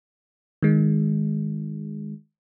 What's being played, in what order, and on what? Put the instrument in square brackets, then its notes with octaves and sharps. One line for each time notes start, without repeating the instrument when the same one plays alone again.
[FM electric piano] D#3 G#3